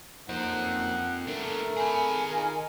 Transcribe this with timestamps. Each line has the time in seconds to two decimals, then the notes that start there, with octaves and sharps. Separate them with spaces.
0.29 F#2 F3 A#3 C4 D#4 F#5
1.27 A3 B3 D4 A4 A#4
1.77 G#4 G#5 B5
2.31 D#3 D#4 F4 A#4